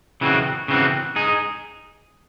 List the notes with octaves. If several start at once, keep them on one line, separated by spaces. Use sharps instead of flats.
C#3 E3 C4 F#4
C#3 E3 C4 F#4
D#4 G#4